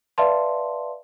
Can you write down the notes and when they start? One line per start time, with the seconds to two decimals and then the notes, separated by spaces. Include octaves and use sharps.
0.18 B4 D5 E5 F5 A5 C6